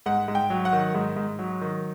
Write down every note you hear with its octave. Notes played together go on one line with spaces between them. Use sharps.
G#2 F#5
G#2
G5
F#3
F#5
D#3
G#2
G#2
F#3
D#3